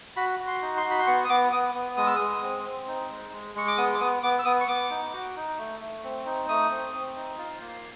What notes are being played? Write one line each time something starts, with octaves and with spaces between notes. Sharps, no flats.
F#4 B5
F#4
C6
D#4
C6
F#4
B5
C6
B3 C#6
D#6
B3 D6
B3 D#6
B3
G#3 D#6
E6
G#3 D#6
C4
C4
D#4
G#3
G#3
G#3 C#6
D6
B3 D#6
D6
B3 D#6
B3 D6
E6
B3 D#6
C#6
B3 D6
D#4
F#4
D#4
A3
A3
C4
D#4
A3 D#6
C4
C4
D#4
F4
A#3